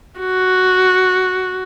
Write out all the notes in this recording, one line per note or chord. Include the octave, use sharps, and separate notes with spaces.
F#4